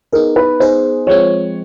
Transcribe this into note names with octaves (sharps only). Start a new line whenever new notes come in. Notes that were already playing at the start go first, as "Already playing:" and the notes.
B3 D#4 G#4 A#4
B4
B3 D#4 G#4 C5
F3 G#3 C4 C#5